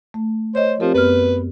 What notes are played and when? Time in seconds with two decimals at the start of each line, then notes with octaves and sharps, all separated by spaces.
0.14 A3
0.55 C5 C#5 D#5
0.80 F3 C4 G4 A#4
0.94 F#2 B3 B4 F6